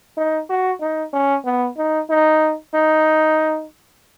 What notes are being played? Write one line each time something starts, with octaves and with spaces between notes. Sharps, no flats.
D#4
F#4
D#4
C#4
B3
D#4
D#4
D#4